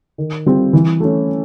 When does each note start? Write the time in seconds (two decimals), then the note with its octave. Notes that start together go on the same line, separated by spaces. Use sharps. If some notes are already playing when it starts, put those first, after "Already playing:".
0.18 D#3
0.46 G3 C4 F4
0.73 E3
1.00 A3 C#4